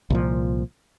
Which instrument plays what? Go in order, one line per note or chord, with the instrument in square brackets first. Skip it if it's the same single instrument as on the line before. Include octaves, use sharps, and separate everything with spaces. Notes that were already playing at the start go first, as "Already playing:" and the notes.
[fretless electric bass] C2 A#2 F3